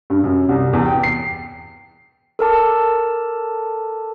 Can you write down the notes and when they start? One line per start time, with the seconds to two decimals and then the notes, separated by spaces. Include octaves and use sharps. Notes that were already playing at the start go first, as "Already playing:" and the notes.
0.10 G2
0.24 F#2
0.49 C2
0.73 E2
0.86 G5
1.03 C7
2.39 A4 A#4 A5 D6